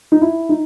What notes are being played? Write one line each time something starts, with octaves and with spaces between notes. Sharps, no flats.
D#4
E4
D#4